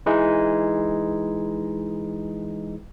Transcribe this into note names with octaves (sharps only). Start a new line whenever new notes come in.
E3 G#3 D#4